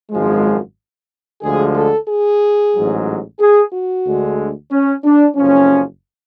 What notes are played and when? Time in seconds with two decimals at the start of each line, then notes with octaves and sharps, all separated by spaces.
0.12 G#1 F#2 F3 G#3
1.43 D2 D3 F3 G#3 G#4
1.76 A4
2.09 G#4
2.74 A1 G#2 F#3
3.40 G#4
3.73 F#4
4.06 D2 D3 G#3
4.71 C#4
5.05 D4
5.36 F#1 F2 F3 C#4